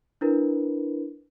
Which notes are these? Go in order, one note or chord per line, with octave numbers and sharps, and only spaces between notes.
D4 E4 A#4 B4